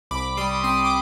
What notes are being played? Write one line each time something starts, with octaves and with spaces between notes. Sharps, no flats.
C2 B5 D6
G3 C6 D#6
C4 C6 D#6
D6